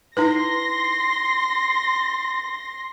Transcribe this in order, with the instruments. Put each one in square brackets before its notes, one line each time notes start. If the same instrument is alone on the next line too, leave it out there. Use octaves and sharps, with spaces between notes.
[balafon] D#4 E4 B4 [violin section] C6 A#6